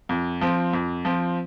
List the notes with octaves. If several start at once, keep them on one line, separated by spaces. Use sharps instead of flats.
F2
F3 C4
F2
F3 C4